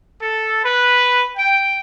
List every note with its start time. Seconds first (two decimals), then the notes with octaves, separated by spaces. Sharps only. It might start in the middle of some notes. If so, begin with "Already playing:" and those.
0.21 A4
0.64 B4
1.37 G5